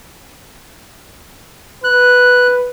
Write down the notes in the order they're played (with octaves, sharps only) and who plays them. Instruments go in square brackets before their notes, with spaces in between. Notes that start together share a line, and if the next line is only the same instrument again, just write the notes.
[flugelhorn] B4 [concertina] F#6